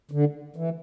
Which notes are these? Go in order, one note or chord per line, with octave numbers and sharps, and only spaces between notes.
D3
E3